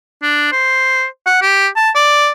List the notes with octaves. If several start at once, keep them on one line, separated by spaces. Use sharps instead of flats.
D4
C5
F#5
G4
A5
D5